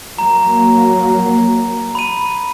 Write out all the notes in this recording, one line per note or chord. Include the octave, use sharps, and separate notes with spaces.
F#3 A#3 A#5
B5 D#7